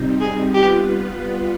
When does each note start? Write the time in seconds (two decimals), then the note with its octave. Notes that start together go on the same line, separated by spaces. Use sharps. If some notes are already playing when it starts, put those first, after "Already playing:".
Already playing: C3 G3 C4 D#4
0.21 G#4
0.54 G3 B3 F4 G4 B4